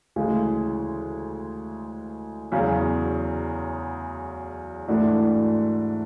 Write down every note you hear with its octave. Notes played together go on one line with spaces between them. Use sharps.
D2 C#3 E3 G#3
E2 C#3 F#3
G#2 E3 A3 D4 F#4